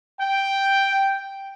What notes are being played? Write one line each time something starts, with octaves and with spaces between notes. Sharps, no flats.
G5